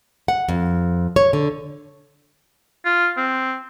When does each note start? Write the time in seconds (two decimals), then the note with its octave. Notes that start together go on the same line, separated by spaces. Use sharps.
0.28 F#5
0.48 F2
1.16 C#5
1.33 D3
2.85 F4
3.17 C4